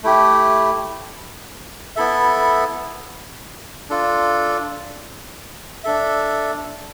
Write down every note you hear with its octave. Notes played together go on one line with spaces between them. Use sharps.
A3 E4 G4
B3 E4 A4 E5
D4 F4 A4
D4 A4 E5